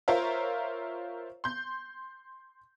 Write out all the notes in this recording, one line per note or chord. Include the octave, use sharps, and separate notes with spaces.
F4 A#4 C5 C#5 E5 F5
C6 G6